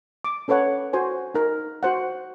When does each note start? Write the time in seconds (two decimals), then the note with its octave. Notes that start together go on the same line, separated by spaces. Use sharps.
0.24 D6
0.48 C#4 A4 B4 C#5 F#5
0.93 F#4 C5 G#5
1.34 D#4 A#4
1.83 F#4 C5 F#5